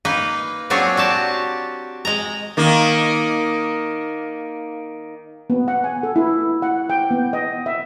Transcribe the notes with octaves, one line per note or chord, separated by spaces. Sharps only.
A#3 D#4 B4
A#2 F#3 C4 D4 G#4 C#5
F#4 G4 A5
G#3 A#5
D#3 A#3
B3
F#5
G#5
A4
E4
F#5
G5
B3
D#5
E5